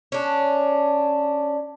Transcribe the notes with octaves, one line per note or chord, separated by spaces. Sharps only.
C#4 D4